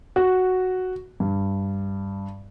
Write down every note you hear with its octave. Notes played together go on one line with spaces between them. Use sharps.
F#4
G2